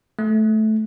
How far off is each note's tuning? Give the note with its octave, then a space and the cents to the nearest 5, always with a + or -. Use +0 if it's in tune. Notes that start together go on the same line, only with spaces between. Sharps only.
A3 -15